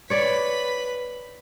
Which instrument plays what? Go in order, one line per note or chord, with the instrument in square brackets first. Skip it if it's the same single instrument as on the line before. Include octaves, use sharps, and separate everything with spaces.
[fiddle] B4 B5 [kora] C#5 D5